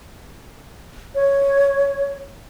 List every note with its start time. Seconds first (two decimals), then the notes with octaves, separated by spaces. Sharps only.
1.15 C#5